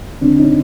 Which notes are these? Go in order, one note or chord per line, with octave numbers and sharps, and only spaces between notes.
D3 C4 D4
C#4 D#4